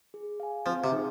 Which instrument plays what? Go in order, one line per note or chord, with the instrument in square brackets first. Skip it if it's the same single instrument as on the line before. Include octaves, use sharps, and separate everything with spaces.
[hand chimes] G#4
F5 G#5
[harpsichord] F3 [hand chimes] C4
[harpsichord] C3
[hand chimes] D#4 G#4